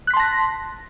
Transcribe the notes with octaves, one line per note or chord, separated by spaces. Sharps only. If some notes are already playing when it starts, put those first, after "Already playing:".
A5 C6 F#6 A#6 B6